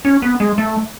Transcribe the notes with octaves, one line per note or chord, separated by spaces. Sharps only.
C#4
B3
G#3
A3